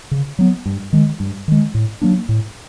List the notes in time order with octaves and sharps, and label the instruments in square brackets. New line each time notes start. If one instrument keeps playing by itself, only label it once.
[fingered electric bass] C#3
F#3 B3
G2
D#3 G#3
G2
D#3 G#3
A2
F#3 A#3 D4
A2